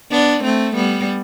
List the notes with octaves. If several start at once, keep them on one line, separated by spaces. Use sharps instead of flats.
B3 D4
A3 C4
G3 B3